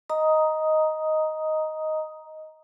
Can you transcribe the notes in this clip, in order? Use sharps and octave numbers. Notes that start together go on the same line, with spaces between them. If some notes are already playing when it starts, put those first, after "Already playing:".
D#5 A#5 D#6